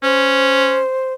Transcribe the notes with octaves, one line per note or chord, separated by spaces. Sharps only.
C#4 C5